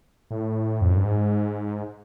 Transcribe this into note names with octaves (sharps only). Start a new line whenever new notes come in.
A2
F2
F#2
G2
G#2